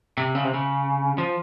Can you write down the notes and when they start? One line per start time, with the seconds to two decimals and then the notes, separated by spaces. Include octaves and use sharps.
0.18 C3
0.35 C#3
0.44 C3
0.54 C#3
1.18 F3